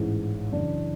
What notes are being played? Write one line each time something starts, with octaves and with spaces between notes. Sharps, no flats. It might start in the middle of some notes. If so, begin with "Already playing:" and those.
Already playing: A1 G#2 E3
F#2 C#3 E3 D4